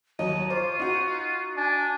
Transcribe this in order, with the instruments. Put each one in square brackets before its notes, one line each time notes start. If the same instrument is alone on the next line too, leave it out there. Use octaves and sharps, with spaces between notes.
[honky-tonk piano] D#2 F#3 D#5 [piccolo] D#7
[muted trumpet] F4 [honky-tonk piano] C5 D6 [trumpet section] C#6
[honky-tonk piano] D#4 F#4
[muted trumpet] D4 [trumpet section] G#5 A5